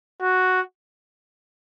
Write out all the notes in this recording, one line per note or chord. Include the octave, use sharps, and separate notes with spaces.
F#4